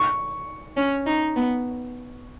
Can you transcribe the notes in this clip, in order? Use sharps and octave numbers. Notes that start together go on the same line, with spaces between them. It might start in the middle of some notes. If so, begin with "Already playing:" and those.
Already playing: C#6
C#4
D#4
B3